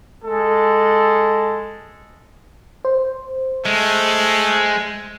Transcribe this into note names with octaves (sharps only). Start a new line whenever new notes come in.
G#3 A4
C5
G#3 A3